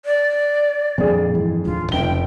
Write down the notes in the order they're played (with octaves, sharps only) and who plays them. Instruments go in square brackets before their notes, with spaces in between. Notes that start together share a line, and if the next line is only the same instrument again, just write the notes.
[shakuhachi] D5
[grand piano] F2 G#4 [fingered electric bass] A#2 D3 G#3
[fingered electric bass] G2 E3 G#3
[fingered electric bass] D#1 A2 D3 [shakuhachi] F4
[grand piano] F1 G7 [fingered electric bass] F2 C#3 F3 [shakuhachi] G5